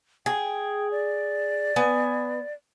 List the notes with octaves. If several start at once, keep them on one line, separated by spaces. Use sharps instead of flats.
G#4 G5
D5
B3 G#5